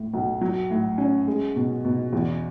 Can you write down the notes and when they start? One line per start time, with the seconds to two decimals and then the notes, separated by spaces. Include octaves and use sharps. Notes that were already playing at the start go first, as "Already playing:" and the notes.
Already playing: A2
0.13 B1
0.41 F#3
0.70 A2
0.98 C#4
1.27 G#3
1.56 B2
1.85 B2
2.13 E2